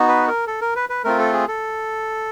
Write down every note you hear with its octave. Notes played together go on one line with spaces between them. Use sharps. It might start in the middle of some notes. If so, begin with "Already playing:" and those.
Already playing: B3 D#4 F#4
B4
A#4
A4
A#4
B4
B4
A3 C4 F4 A#4
A4
G#4
A4